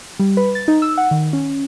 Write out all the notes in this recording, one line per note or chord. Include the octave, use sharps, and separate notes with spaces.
G3
B4
A6
D#4
E6
F#5
D#3
C#4